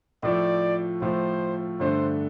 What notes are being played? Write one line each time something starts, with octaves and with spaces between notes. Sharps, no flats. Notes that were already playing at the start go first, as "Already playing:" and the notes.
A2 F3 A3 D5
A2 F3 A3 C5
G2 D3 A3 D4 C5